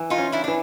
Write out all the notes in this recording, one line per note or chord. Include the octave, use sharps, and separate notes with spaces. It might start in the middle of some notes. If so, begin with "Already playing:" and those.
Already playing: E3
D#4 F4
C#4
D4 E4
E3 D4